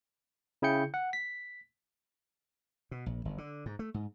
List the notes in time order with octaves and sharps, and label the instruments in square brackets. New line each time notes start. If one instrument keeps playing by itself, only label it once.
[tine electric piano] C#3 E4 G#4 G5 G6 C#7
F#5
B6
[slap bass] B2
A#1
G1
D3
G#2
A3
G#2